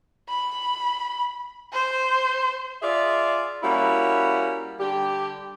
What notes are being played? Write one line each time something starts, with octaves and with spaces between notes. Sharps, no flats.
B5
C5
F4 G#4 D5 E5
G3 A#3 C#4 E4 F#4
D3 G3 G4